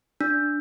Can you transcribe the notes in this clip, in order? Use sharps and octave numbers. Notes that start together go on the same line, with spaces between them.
D4